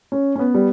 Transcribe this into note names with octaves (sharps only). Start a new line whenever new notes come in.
C#4
C#4
B3
G3